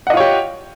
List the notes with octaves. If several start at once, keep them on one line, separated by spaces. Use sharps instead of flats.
F4 G4 C#5 D#5 F#5